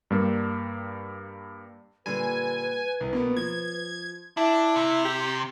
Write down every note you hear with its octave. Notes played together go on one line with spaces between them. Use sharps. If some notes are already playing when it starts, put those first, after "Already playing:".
G2 G3 A#3
A#2 D3 G3 B4 G#5
C2
B2 A#3 B3
F3 G#6
D4 E4
C3
G4